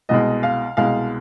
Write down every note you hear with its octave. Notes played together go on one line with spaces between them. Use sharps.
C2 B2 G#3 D#5
F5
C2 B2 G#3 F5